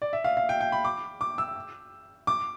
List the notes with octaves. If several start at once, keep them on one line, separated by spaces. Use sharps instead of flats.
D5
E5
F5
F5
G5
G5
B5
D6
D6
E6
D6